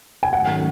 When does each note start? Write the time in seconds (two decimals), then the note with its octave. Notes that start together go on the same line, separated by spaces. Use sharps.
0.23 G#5
0.33 G#2 D#3 F#3 A3 C#4 F#5